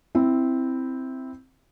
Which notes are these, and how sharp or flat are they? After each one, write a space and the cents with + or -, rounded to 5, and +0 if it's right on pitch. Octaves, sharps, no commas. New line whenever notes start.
C4 +0 E4 +0